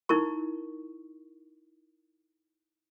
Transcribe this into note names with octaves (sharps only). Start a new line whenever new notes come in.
D#4 E4 A#4 C#6